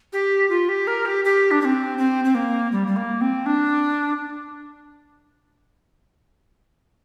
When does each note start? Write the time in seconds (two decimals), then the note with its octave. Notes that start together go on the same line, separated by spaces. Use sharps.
0.13 G4
0.50 F4
0.69 G4
0.87 A#4
1.06 G4
1.25 G4
1.51 D4
1.61 D4
1.65 C4
1.98 C4
2.25 C4
2.35 A#3
2.72 G3
2.87 G3
2.96 A#3
3.21 C4
3.46 D4